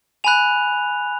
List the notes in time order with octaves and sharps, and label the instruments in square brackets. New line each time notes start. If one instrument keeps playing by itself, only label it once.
[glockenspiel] G#5 B5 F#6 F7